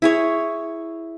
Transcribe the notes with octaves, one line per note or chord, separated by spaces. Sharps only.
E4 G#4 C#5